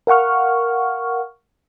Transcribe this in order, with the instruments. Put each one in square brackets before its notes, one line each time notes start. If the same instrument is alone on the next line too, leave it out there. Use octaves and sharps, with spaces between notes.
[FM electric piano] A#4 F5 F#5 C#6 F6